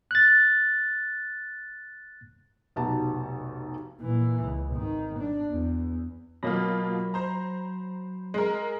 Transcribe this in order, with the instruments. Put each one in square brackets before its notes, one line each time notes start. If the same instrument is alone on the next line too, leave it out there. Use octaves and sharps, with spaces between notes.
[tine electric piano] F#6 A6
[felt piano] F1 B1 F#4 G4 A5 A#5
[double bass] A#2 E3
C#2
G#1 D#3
D4
E2
[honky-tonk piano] B2 A#3 F4 [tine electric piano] F#3 B5 A#6
[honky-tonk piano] C5 A#5
G#3 A#4